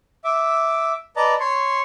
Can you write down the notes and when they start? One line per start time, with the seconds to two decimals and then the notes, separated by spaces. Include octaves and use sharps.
0.24 E5 D6
1.16 B4 D5 D#5 A5 A#5
1.40 C#5 C6 C#6